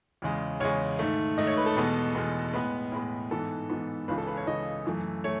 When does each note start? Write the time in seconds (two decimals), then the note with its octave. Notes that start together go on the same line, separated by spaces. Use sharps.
0.22 E2 C#3 G#3
0.60 E2 C#3 G#3 C#5
0.99 G#2 D#3 A3
1.37 G#2 D#3 A3 D#5
1.47 C#5
1.57 B4
1.66 A4
1.76 E2 B2 G#3 B3
2.15 E2 B2 G#3 B3
2.54 A2 G#3 B3 B4
2.92 A2 G#3 B3
3.31 G#2 E3 B3 A4
3.70 G#2 E3 B3
4.08 C#2 C#3 E3 B4
4.18 A4
4.27 B4
4.37 C#5
4.47 C#2 C#3 E3 D#5
4.85 F#2 E3 A3
5.24 A3 C#5